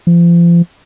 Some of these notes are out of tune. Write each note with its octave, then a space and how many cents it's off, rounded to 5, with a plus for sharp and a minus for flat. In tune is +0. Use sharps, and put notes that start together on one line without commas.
F3 -35